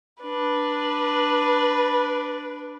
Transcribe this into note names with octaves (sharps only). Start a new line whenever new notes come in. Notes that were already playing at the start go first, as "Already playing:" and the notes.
D4 B4